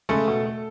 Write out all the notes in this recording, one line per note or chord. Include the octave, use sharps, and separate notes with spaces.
C#3 G#3 A3 A4
B2
A3